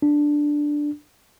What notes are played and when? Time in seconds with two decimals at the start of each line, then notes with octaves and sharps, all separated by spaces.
0.02 D4